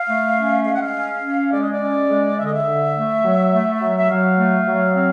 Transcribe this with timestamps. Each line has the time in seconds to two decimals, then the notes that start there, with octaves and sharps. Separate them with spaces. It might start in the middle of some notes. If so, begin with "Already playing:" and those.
Already playing: F5
0.08 A3
0.37 C#4
0.65 G#3 F5
0.75 F#5
0.82 F5
0.94 C#4
1.22 C#4
1.52 G#3 D5
1.62 D#5
1.72 D5
1.80 C#4
2.09 G#3
2.38 D3 E5
2.46 D#5
2.55 E5
2.66 D3
2.95 A3
3.24 F#3
3.52 A3
3.81 F#3
3.97 E5
4.10 F#3 F5
4.38 A3
4.68 F#3
4.95 C4